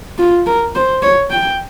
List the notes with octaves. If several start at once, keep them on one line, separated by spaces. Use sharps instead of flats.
F4
A#4
C5
C#5
G5